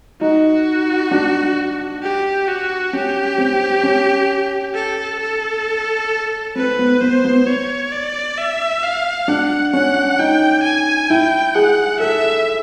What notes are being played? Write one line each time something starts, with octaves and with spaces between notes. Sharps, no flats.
D#4 F#4
D4
G4
F#4
C#4 G4
C4
C#4
A4
A4
C4 B4
B3
B3 C5
B3
C#5
D5
E5
F5
D4 F#5
C#4 F#5
D#4 G5
G#5
E4 G5
G#4 F#5
A4 E5